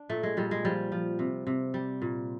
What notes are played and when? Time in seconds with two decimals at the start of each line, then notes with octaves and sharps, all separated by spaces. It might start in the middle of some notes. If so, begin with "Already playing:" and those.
Already playing: D4
0.09 A#2 A3
0.23 G#3
0.37 A#2 G3
0.51 G#3
0.65 F3 G3
0.92 F3
1.19 C3
1.47 C3
1.74 G3
2.02 A#2